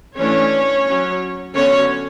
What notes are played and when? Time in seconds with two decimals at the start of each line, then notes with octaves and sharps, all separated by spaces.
0.16 E3 A3 C#4 D4 C#5
0.86 F#3 C#4
1.55 D3 F#3 B3 C#4 C#5